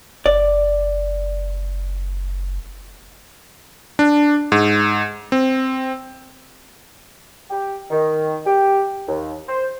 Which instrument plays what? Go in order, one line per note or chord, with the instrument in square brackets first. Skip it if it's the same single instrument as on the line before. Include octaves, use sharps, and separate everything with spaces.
[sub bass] F#1 [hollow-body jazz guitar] D5
[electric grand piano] D4
G#2
C4
[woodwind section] G4
D#3
G4
D#2
C5